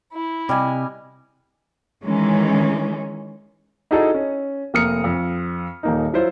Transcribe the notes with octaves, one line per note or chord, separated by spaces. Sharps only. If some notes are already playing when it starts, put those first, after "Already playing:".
E4
C3 G3 D#5 G#5
D#3 E3 G#3 C#4
D#4 E4 F#4 G#4 A4 D#5
C#4
F1 A#3 D#6 F6 C#7
F2
D#1 A#3 D#4
F#3 E4 F4 C5